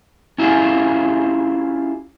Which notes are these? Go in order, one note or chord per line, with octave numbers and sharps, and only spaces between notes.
C#4 E4 F4 G4 G#4